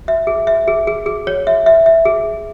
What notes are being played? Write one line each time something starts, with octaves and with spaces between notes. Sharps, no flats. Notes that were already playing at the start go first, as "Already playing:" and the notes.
E5
G#4
E5
G#4
G#4
G#4
C#5
E5
E5
E5
G#4